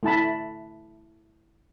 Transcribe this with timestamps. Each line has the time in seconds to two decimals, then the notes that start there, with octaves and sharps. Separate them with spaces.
0.03 A3 E4 A5 B5